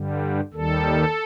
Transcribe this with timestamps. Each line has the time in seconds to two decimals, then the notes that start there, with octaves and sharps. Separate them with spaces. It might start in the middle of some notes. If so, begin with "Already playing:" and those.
Already playing: G2 D3 G3
0.53 D#2 D#3 G3 A4